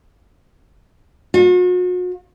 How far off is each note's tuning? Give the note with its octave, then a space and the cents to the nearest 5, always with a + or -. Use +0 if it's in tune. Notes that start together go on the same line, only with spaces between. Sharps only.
F#4 -40